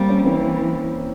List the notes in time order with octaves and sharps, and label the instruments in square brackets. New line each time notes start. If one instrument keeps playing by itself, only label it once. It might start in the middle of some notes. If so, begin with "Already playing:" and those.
Already playing: [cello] G3 [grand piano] A#3 C4
[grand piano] C#4
[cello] E3 [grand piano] C4